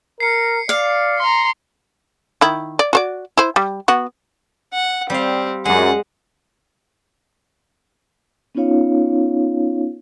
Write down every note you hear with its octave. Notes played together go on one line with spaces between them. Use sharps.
A#4 C7 C#7
D5 F5
A#5 C6
D#3 E4
D5
F#4 C5 D5
E4 C5
G3
B3 F#4
F#5
G3 C4 F5
F#2 G#3 F#5
B3 C#4 D#4 F4 C#5 F5